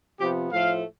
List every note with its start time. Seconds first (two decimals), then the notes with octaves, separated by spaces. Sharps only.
0.19 C3 F3 B3 G4
0.51 A2 F3 A3 F5